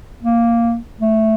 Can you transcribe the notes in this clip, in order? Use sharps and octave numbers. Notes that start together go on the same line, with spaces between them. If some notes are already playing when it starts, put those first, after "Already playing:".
A#3
A3